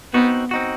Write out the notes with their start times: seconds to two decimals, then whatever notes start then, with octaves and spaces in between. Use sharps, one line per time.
0.14 B3 C4 D#4 F#4
0.51 C4 D#4 F#4